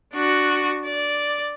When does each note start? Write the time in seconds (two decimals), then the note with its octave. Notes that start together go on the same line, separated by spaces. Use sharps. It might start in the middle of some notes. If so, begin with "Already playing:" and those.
0.14 D4 F#4
0.85 D5